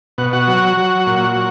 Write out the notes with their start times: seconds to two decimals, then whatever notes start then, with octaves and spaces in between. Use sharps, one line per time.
0.18 B2 F#5
0.33 F#4 F#5
0.47 F#3
0.77 F#3
1.07 A#2
1.36 F#3